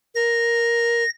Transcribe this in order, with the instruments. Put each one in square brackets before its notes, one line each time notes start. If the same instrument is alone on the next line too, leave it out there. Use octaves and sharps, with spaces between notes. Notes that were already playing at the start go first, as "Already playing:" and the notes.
[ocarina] A#4 [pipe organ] A#6